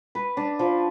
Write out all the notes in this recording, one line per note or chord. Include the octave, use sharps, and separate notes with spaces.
B4
D4
F3